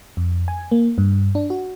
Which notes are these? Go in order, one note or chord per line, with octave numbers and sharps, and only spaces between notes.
F2
G#5
A#3
G2
D4
F#4